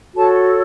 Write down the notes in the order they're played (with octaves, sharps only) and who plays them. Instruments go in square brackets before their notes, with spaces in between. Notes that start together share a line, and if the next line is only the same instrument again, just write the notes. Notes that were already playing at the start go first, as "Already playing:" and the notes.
[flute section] F#4 A4 C#5 A5